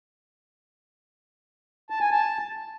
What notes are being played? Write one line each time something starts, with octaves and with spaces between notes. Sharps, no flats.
A5
G#5
A5